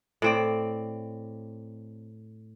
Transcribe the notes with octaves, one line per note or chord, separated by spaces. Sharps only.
A2 C4 D5